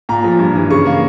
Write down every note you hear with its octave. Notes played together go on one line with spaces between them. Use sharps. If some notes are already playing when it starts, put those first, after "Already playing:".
A#2 A#5
F3
G2
E3
C#3 C#6
A#3